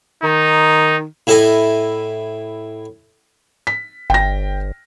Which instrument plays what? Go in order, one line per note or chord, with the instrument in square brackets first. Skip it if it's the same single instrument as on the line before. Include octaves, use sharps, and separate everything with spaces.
[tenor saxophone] D#3 [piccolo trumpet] D#4
[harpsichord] A2 E4 A4 D#5 G#5
[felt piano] B6
[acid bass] G1 [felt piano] G5 A#6